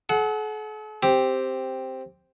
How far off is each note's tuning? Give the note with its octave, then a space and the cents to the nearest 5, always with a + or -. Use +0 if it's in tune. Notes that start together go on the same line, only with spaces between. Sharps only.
A4 -45 F#5 +0
C4 +0 G4 +0